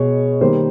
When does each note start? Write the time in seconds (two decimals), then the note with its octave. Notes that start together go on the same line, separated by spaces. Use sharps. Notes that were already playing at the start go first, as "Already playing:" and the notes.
Already playing: B2 G#3 C#5
0.41 D#3 G3 A#3 C5